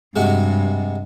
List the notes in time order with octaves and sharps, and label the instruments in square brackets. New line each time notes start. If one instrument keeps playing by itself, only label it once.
[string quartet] G2 [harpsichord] C3 G#3 F#4